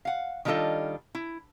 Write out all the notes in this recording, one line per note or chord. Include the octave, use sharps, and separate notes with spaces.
F5 F#5
D#3 G3 D4 F4 A4 D#5
E4